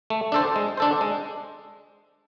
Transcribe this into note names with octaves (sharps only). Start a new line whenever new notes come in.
A3
D4 A4 C5
G#3
D4 A4 C5
G#3